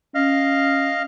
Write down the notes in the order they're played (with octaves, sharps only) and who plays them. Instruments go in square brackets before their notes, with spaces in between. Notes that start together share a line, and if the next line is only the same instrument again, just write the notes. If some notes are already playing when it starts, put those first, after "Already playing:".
[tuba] C#4 [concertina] D#5 F5 F6